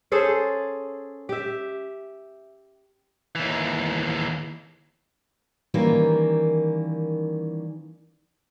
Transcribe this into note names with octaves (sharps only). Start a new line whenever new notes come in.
C#4 G#4 A4 C5
G4 E5
D#2 E3
D#3 E3 G3 A#3 C#4